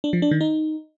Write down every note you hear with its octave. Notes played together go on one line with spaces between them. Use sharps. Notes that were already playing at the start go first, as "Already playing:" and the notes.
D4
F3
D4
D#3
D#4